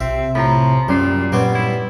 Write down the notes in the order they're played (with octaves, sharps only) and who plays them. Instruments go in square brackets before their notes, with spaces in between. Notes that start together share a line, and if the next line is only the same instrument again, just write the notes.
[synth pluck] B1 [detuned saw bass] C3 [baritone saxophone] C4 [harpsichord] E5
[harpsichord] A2 [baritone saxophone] F3 [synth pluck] A#5 B5
[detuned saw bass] F#2 [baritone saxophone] A#2 [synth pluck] F#3 C#4 C7 [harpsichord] G3
[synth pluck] A#2 [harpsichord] G3 B3 C#5 [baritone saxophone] C4
[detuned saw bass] G2 [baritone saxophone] E4